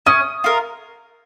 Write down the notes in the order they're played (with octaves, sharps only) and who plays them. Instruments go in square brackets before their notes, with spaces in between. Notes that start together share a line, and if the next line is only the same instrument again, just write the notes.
[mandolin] C#4 [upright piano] D#6
[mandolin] F4 A#4